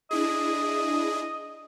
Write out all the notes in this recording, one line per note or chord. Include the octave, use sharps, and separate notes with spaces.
D4 E4 G#4 D#5